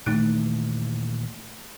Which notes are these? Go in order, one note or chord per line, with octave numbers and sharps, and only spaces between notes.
A#2 D#3 E3 A3 D#4 F#6